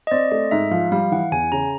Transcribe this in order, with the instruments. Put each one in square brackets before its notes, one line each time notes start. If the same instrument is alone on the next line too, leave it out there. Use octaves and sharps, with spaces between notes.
[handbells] D#5
[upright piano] C4 [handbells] D5
[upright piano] A3 [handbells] D#5
[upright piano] G#2 [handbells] E5
[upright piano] F3 [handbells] F5
[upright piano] G3 [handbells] F5
[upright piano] E3 [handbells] F#5
[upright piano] E2 [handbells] G#5
[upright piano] C#3 [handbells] A#5